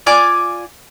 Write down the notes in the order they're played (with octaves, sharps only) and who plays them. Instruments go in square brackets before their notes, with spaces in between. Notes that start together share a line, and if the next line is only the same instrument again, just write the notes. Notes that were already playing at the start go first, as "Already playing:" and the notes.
[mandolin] F4 D5 G#5 D6